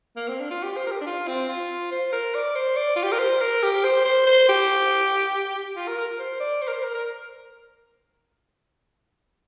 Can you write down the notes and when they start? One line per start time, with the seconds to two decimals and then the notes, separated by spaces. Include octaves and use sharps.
0.16 A#3
0.28 C4
0.40 D4
0.51 F4
0.63 G4
0.77 C5
0.87 A#4
0.91 G4
1.01 D4
1.06 F4
1.27 C4
1.49 F4
1.92 C5
2.12 A#4
2.34 D5
2.55 C5
2.77 D5
2.96 F4
3.03 G4
3.12 A#4
3.19 C5
3.41 A#4
3.63 G4
3.84 C5
4.05 C5
4.27 C5
4.49 G4
5.76 F4
5.87 A#4
5.98 A#4
6.19 C5
6.40 D5
6.62 C5
6.68 A#4
6.73 C5
6.83 A#4
6.94 A#4